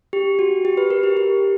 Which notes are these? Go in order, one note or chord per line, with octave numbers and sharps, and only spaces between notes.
G4
F#4
G4
B4
A#4
G4
G4